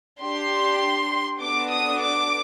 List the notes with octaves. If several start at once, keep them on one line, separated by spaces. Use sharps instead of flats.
D4 G4 C6
B3 D4 F#4 A4 D6
D#6
D6